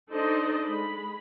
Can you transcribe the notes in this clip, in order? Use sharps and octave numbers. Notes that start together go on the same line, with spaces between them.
D4 D#4 A4 C5 D5 D#5
G#3 B5